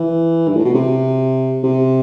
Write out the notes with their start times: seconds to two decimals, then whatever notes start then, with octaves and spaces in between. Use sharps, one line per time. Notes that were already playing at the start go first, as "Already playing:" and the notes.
Already playing: E3
0.48 G2
0.56 A2
0.65 B2
0.74 C3
1.63 C3